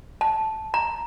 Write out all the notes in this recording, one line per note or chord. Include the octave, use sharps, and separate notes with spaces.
A5
A#5